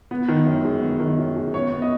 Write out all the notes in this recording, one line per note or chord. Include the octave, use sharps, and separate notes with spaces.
B3
D#3
F#2
G#3
B3
D#3
F#2
G#3
B3 C#5
B3
D#5